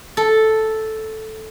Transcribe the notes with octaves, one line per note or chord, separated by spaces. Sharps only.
A4